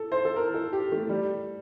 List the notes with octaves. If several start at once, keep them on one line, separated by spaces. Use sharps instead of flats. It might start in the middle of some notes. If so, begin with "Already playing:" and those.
Already playing: A4
C5
A4
A#4
A4
G4
A3
G3